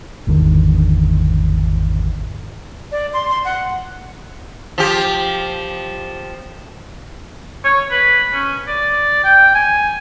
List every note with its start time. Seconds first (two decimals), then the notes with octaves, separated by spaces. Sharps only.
0.27 G#1 E2 D3 D#3
2.92 D5
3.13 C6
3.28 C6
3.45 F#5
4.78 F3 G4
7.64 C#5
7.91 B4
8.33 C#4
8.67 D5
9.24 G5
9.55 G#5